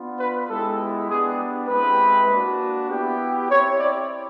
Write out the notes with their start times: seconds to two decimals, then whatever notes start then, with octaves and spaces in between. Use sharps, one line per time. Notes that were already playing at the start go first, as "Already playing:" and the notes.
Already playing: B3 D4 F4
0.19 B4
0.49 G#3 B3 E4 G4 A4
1.09 B3 D4 G4 G#4
1.69 G#3 C4 E4 G4 B4
2.29 A#3 D4 F#4
2.89 B3 E4 G4
3.49 C4 E4 G4 C#5
3.79 D5